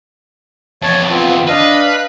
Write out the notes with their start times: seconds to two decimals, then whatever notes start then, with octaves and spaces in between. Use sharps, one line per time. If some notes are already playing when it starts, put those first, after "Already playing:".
0.82 F2 E3 C#5 A5
1.10 B3 C4 F4
1.48 D4 B4 D#5 F5
1.86 F5 F#6